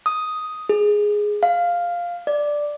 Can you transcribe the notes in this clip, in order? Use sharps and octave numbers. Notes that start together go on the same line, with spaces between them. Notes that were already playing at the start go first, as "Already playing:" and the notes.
D#6
G#4
F5
D5